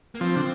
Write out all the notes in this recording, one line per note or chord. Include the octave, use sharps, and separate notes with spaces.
A#3
F3 C4
D3